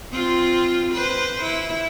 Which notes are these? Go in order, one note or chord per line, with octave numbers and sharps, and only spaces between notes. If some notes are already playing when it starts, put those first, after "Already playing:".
C4 F4
B4 C5
E4